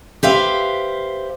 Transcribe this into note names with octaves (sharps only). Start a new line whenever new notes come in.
G4 B4 C5 E5 F5